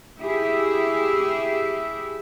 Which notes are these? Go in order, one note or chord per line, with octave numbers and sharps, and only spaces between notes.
E4 G4 G#4 E5